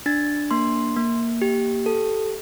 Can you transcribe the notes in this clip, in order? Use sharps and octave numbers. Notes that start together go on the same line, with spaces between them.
D4 A6
A#3 C6
A#3
G4
A4